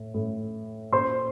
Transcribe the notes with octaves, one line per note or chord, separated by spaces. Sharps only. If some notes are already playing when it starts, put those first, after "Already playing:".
Already playing: A2
A2
A#2 C5 C6